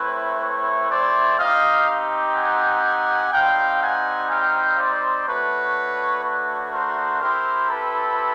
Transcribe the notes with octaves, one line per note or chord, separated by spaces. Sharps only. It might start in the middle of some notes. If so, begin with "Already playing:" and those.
Already playing: A3 C4 E4 B4 C#5
B4 C#5
C5 D5
C4 D#4 G4 D#5 F5
F#5 G#5
G3 C4 D#4 F5 G5
F#5 G#5
F5 G5
C5 D5
A3 D4 F#4 B4 C#5
B4 C#5
A#4 C5
C4 E4 G4 A#4 C5
A4 B4